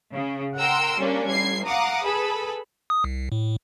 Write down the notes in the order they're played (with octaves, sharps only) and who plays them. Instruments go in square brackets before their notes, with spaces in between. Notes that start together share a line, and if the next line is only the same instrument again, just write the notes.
[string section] C#3
A#4 F#5 G5 A#5 C6 E6
G3 A#3 C#4 D4
A1 G3 G#6 C7
F5 F#5 A#5 D6 D#6
G#4 A4 B4 B5
[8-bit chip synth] D#6
C2
A2